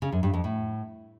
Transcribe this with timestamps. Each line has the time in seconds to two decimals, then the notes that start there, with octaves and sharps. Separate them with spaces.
0.02 C#3
0.12 F#2
0.23 G2
0.33 F2
0.44 A2